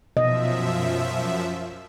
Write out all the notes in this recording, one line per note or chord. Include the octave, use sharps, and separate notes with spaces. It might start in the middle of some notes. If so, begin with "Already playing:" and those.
F#2 B2 F3 D#5 E5